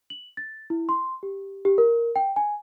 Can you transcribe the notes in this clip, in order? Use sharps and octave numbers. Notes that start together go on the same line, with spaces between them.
F#7
A6
E4
C6
G4
G4
A#4
G5
G#5